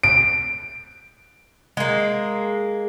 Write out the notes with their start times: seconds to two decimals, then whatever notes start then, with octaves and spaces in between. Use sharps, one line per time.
0.03 D7
1.77 G#3 A#3